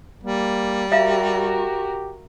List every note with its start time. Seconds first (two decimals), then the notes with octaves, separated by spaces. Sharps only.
0.23 G3 A#3
0.92 F#4 G4 A#4 E5 F5 A#5